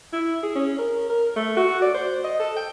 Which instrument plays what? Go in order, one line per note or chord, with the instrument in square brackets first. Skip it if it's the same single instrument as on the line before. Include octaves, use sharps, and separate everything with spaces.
[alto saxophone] E4
G#4
C#4
A#4
A#4
A3
F#4
D5
C5
D#5
A4
G5